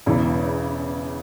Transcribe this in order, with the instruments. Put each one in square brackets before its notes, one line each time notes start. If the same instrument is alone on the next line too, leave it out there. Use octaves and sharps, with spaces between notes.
[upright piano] E1 E2 C#3 E3